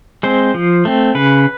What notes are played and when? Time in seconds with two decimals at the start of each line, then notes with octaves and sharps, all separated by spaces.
0.23 G#3 C4 C5
0.54 F3
0.85 A3 C4
1.15 C#3 B4